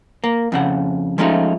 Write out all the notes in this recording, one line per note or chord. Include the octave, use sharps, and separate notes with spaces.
A#3
F2 C#3 F#5
F3 G#3 A3 C#4 D#4 F4